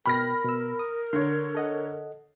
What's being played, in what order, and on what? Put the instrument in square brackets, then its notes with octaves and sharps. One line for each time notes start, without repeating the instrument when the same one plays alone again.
[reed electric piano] B2 G5 [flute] A#4 [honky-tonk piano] B5 F6 A#6
[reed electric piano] B2 E6
D#6
[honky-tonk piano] D3 C#5 [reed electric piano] C6
[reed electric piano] A4 D#5 F#5